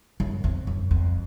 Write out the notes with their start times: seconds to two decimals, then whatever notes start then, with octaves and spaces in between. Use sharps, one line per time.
0.20 F#2
0.44 F2
0.67 F#2
0.91 F2